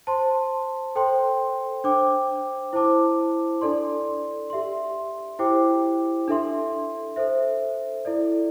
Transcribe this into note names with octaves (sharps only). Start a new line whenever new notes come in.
C5 A5 C6
A4 C5 G5 C6
D4 C5 G5 D6
E4 C5 A5 D6
D4 A4 D5 C6
G4 E5 C6
E4 G4 C5 G5 D6
D4 A4 E5 C6
A4 C5 E5
E4 A4 D5